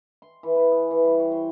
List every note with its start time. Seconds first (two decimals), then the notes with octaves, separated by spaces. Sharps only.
0.22 C6
0.43 E3
0.56 B4
0.71 G#4
0.91 E3
1.05 G3
1.19 C#5
1.32 C5